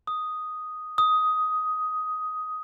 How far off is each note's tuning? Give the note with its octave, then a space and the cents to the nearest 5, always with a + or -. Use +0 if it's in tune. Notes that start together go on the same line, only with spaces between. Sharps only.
D#6 +0
D#6 +10